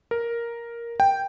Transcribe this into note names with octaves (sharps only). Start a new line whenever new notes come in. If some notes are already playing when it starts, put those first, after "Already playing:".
A#4
G5